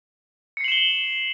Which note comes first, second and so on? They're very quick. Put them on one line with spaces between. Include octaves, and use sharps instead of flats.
C#7 C7 F#7 E7 G7